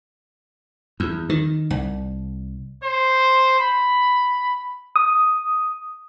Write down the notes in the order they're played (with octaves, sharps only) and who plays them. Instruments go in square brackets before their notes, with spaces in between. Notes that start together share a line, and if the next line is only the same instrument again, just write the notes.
[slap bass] E2
D#3
C2
[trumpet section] C5
B5
[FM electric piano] D#6